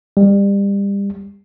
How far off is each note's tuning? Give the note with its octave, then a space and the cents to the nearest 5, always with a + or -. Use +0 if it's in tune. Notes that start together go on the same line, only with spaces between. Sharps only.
G3 +30